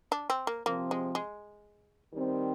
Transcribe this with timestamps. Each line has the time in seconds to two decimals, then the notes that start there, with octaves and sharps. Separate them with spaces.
0.12 D4
0.30 C4
0.47 A#3
0.66 C3 F3 A#3 C4
0.91 G#3
1.15 G#3
2.12 D#3 G3 C4